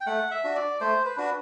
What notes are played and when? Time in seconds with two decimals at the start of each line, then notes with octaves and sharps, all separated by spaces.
0.01 G5
0.06 A3 F#5
0.31 E5
0.44 D4 F#4
0.56 D5
0.81 A3 C5
1.05 B4
1.17 D4 F#4 B4